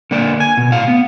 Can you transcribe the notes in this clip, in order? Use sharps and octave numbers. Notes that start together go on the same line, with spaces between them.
D3 A#3 D5
G#5
B2
A2 F5
B3